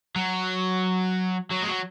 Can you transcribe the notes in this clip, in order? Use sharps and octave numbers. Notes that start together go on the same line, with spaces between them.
F#3
F#3
G#3
F#3